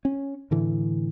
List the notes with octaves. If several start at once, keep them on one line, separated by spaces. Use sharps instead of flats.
C#4
A2 D3 E3